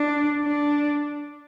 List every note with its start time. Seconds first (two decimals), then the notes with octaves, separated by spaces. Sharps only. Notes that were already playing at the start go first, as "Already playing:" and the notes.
Already playing: D4
0.45 D4